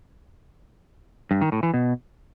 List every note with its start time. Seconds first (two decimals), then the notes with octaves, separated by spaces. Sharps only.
1.31 G2
1.41 D#3
1.52 A2
1.63 E3
1.74 B2